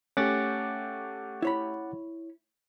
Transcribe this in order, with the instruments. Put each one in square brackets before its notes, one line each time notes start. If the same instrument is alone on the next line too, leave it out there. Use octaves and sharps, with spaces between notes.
[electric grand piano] A3 G4 [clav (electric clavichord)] C#4 [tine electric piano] F#5 D6 A6
[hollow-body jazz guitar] E4 C#5 B5